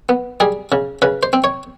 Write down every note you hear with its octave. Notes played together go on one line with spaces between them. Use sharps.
B3
G3 G#4
C#3
C#3 B4
C5
C4
C#5